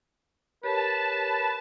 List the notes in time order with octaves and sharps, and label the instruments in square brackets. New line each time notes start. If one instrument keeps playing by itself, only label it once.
[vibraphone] G4 A#4 C#5 [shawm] B4 [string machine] A5